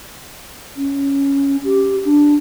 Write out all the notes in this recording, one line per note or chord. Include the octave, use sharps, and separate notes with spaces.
C#4
G4
D4